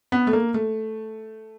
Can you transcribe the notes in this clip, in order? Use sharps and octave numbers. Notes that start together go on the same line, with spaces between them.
B3
A3
A#3
A3